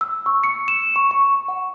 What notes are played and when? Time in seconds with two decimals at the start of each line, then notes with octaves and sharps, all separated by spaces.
0.01 E6
0.26 C#6
0.44 C#7
0.68 E7
0.96 C#6
1.11 C#6
1.48 F#5